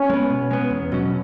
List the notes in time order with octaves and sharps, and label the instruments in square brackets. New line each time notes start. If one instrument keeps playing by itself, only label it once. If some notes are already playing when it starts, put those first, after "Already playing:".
Already playing: [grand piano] C#4
[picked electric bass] G#3 B3
B2
G#3 B3
E2
B2 F#3 C#4